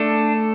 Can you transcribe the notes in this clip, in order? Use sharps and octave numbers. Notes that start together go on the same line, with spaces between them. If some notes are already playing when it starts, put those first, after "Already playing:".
Already playing: A3 D4 A4